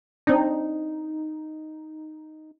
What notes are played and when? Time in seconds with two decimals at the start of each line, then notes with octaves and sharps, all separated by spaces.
0.27 C4 D4 D#4